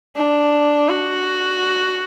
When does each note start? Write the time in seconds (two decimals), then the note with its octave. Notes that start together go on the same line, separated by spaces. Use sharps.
0.17 D4
0.89 F#4